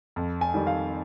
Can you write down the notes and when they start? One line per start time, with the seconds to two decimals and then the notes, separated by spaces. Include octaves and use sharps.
0.16 F2
0.41 G#5
0.54 D#3 G3
0.67 F5